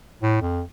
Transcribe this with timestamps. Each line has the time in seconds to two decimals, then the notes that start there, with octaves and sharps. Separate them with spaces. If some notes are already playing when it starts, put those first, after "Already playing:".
0.22 A2
0.42 F2